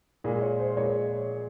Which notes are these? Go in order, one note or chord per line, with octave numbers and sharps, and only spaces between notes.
A#2 G#3 G#4
C#5
C5
A#2 G#3 C#5